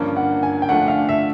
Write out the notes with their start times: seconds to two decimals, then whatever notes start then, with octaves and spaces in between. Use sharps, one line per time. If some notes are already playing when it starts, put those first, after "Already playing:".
Already playing: G2 D3 F3 A#3 C#4
0.17 F#5
0.43 G#5
0.62 G5
0.69 D3 F3 A3 D4 F#5
0.88 F5
1.09 E5